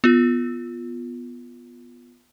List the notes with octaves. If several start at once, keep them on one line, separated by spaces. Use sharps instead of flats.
B3 F4